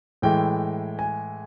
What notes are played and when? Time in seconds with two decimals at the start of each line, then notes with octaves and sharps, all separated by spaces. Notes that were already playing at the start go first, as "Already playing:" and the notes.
0.22 A2 E3 G#3 G5
0.99 G#5